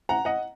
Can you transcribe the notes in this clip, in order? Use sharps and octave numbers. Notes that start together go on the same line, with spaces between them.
F#5 A#5
D#5 F#5